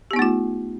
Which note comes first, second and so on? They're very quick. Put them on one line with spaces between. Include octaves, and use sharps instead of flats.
G4 B3 D#4 A3 F4